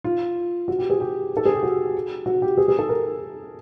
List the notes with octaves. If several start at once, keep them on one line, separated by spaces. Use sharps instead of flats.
F4
F#4
G4
G#4
G4
A4
G#4
G4
F#4
F#4
G4
G#4
G#4
A4
A#4